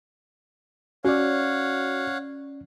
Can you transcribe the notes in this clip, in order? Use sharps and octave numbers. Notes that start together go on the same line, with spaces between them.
C#4 F#4 C#5 D5 F5 F#5